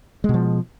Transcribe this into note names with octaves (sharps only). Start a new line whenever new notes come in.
B2 F3 G#3